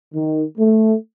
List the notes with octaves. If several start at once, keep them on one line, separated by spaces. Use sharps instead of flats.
D#3
A3